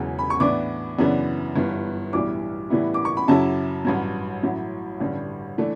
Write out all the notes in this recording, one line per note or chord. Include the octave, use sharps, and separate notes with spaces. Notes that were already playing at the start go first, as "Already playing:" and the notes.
Already playing: E1 E2 C#3 F#3
B5
C#6
A2 E3 B3 D4 D6
F#2 C#3 E3 B3 D4
G1 G2 E3 B3
B1 A2 E3 G3 D4 D6
A2 E3 G3 B3 E4
D6
C#6
B5
F#2 C#3 F#3 C#4 E4 A5
A1 G2 F#3
A1 A2 F#3
A1 G2 D3 G3
E3 A3 D4